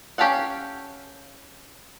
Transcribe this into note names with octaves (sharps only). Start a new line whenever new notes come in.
C#4 G4 A4 F5 F#5